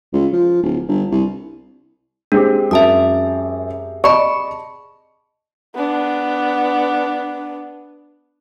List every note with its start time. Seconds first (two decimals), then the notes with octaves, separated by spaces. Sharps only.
0.13 C#2
0.33 F3
0.63 D1
0.88 G1
1.11 C2
2.32 G#3 C4 D4 G4
2.71 F#2 E5 A5 D#6
4.04 D5 D#5 A5 B5 C#6
5.75 B3 D4